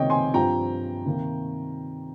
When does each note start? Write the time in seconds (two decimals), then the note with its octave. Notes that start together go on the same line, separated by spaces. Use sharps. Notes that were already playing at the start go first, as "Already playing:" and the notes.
Already playing: C#2 C3 D#3 A#3 C#5 D#5 G5
0.10 G#5 C6
0.34 G2 F3 C4 F4 G5 A#5
1.06 C3 D#3 A#3